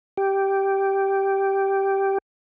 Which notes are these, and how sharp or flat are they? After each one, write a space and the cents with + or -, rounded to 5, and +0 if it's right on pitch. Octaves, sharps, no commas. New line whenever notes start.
G4 -5